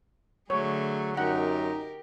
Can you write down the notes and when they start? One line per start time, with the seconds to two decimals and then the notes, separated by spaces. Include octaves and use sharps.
0.50 D3 F#3 A3 G#4 C#5
1.17 F#2 D#4 G4 A#4 F#5